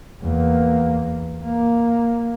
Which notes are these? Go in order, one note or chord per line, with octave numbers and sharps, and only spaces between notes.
E2 A#3
A#3